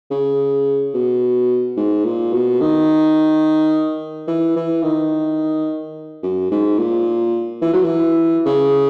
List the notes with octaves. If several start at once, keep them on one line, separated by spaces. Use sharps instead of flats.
C#3
B2
G#2
A#2
B2
D#3
E3
E3
D#3
F#2
G#2
A#2
E3
F#3
E3
C#3